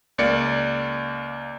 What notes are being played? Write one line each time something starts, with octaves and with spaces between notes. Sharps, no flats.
C#2 A#3 D5 C#7